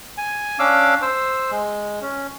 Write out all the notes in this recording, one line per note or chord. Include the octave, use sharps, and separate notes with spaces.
G#5
C#4 D4 F5 D6 E6
C5 E6
G#3
C#4